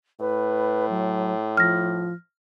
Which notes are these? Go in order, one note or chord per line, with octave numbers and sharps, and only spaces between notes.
A2 B4
F#3
F3 F6 A#6